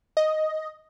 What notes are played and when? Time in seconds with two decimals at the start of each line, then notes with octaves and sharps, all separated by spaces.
0.17 D#5